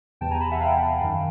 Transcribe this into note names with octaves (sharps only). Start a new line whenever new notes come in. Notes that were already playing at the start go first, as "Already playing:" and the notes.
E2 C3 E3 G5 A5
G#5 A#5
A5 B5
E5 F#5
F5 G5
F#2 D#3